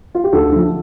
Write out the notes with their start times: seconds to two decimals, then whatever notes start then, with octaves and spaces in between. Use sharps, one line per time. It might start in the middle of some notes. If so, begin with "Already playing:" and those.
0.15 F4
0.24 G4
0.33 D2 A4
0.52 D3 F3